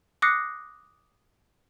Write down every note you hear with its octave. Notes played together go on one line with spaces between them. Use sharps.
D6 D#6 F#6 A#6 C7 C#7